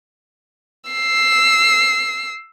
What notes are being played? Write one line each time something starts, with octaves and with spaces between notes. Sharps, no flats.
E6 C7